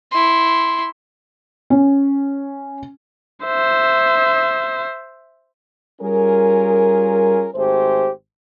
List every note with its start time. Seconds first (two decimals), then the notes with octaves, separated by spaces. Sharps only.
0.11 E4 C6
1.70 C#4
3.45 C5 E5
6.00 G3 C#4 F4 G#4 A#4
7.54 G#1 A3 G4 G#4 C5